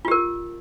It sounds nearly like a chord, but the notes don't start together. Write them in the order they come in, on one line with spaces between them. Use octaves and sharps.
F4 G4 A#4